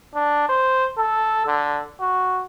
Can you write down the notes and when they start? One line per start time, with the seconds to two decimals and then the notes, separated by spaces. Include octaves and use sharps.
0.15 D4
0.49 C5
0.98 A4
1.47 D3
2.00 F#4